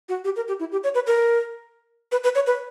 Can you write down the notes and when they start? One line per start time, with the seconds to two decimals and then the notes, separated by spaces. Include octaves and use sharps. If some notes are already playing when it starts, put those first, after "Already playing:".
0.09 F#4
0.25 G4
0.36 A#4
0.48 G4
0.60 E4
0.72 G4
0.84 C#5
0.95 B4
1.07 A#4
2.12 B4
2.24 B4
2.35 C#5
2.47 B4